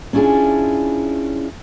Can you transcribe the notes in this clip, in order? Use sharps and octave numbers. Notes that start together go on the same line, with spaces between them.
C#4 D4 E4 F4 G#4